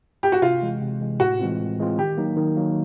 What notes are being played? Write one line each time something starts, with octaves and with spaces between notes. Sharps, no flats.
G4
F#4
C3 F4
E3 G#3
C3
E3 G#3
A2 F#4
E3 G#3 C4 F4
A2
E3 G#3 C4 F4
D#3 G4
F#3 A#3 D#4
D#3
F#3 A#3 D#4